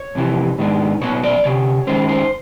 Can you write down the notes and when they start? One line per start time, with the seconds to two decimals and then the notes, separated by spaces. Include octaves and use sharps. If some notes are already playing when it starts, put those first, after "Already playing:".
Already playing: C#5
0.15 F2 C3 E3
0.58 G#2 D#3 G#3 B3 D4
1.01 B1 A#2 F#3 B3 C#5
1.16 C#5
1.23 D5
1.44 D2 C3 C#5
1.87 F#2 D#3 G#3 C#4 C5
2.09 C5